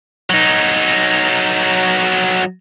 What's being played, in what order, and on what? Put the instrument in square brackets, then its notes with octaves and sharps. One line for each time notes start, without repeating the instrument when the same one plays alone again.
[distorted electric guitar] F#3 D#4